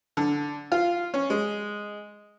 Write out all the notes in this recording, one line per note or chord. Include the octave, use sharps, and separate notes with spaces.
D3
F4
C#4
G#3